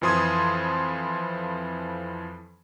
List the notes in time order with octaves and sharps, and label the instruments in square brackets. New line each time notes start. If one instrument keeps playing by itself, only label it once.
[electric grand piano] F2 E3 F3 C6 D#6 G#6